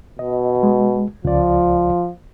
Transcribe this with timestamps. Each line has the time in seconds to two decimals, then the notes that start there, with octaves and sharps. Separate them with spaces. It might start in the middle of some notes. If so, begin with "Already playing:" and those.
0.19 B2 D#5
0.63 G#3
1.25 C#2 F3 D5